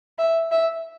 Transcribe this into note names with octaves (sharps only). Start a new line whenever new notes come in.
E5
E5